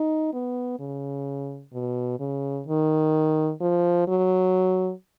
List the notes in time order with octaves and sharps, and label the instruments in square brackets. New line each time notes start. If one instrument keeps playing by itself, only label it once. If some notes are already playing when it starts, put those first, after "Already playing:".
Already playing: [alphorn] D#4
B3
C#3
B2
C#3
D#3
F3
F#3